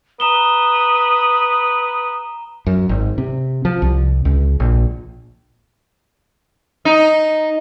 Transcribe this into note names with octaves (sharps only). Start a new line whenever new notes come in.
B4 A#5 D#6 E7 G7
F#2
G#1
C3
F3
C2
C#2
A#1
D#4